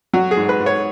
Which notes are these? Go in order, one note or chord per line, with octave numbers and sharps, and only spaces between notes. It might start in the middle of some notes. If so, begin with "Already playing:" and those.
F#3 F#4
G#4
G#2
B4
G#2
C#5